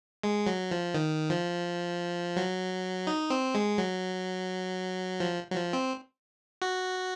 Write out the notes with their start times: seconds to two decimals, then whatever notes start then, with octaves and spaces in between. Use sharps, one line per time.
0.23 G#3
0.47 F#3
0.71 F3
0.94 D#3
1.30 F3
2.36 F#3
3.07 D#4
3.30 C4
3.55 G#3
3.78 F#3
5.20 F3
5.50 F#3
5.55 F3
5.73 C4
6.62 F#4